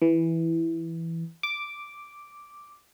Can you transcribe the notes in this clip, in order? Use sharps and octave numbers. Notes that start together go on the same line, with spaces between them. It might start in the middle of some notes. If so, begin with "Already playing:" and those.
E3
D6